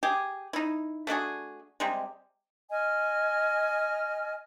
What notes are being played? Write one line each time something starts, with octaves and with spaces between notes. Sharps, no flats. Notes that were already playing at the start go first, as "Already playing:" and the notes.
G4 G#4
D#4 E4
A3 D4 F#4 G#4
C3 G3 G#3
D#5 G#5 F6